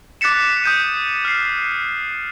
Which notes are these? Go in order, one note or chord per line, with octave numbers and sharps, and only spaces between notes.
D6 F#6 A6 B6 C#7 E7
D#6 G6 D#7
F6 C7